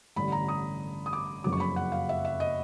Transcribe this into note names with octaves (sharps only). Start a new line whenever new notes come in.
A1 G2 D3 B5
A#5
D#6
D#6
D6
F#1 F2 C#3 F#3 D6
C#6
B5
F#5
F5
E5
E5
D#5